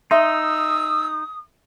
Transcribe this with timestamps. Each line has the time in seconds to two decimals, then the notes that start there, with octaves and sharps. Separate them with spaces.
0.11 D#4 E5 C6 D#6 E6